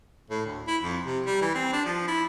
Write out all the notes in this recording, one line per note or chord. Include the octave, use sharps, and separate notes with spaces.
A2
D2
E4
F2
C3
G3
E3
C4
D4
F3
E4